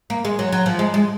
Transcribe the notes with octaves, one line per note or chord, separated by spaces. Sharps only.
A#3
G#3
F#3
F#3
F3
G#3
G#3